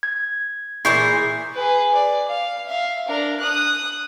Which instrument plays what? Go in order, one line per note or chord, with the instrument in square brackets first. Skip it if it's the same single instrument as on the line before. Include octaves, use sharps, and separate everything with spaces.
[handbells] G#6
[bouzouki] A#2 E3 G#4 [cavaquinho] E4 [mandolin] C5 C#6 G6 [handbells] C7
[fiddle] G#4 B4
D5
F5
E5 F5
D4 A#4
D#6 F#6